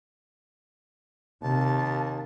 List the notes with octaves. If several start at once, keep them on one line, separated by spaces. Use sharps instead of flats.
D#2 C3 A5